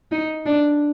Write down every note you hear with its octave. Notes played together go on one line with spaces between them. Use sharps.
D#4
D4